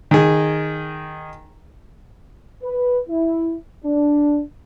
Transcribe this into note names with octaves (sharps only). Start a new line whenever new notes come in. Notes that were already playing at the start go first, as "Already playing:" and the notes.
D#3 G#4
B4
E4
D4